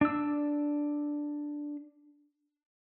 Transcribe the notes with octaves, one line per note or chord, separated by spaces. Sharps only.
D4 E6